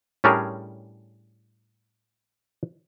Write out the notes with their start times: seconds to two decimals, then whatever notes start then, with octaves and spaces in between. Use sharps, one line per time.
0.24 A2 G3 C#4 D4 G#4 A#4